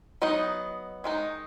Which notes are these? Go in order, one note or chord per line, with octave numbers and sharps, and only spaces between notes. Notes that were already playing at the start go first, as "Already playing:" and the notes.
F#3 B3 D#4 D#5
D#3 G#3 D#4